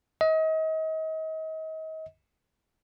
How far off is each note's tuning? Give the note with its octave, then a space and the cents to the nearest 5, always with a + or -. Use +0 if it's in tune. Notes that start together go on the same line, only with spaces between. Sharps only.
D#5 +35